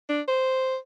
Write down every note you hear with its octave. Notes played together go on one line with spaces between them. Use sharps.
D4
C5